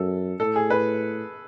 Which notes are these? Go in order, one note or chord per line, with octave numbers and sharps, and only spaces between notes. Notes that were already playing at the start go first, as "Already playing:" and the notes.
Already playing: F#2 A4
A2 A4
G#4
B4